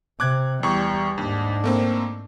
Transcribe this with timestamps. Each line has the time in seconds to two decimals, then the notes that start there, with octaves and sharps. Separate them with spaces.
0.20 C3 D6 F#6 G#6
0.63 E2 G3 C#6
1.18 D#2 G#2 D4
1.64 A3 A#3 C4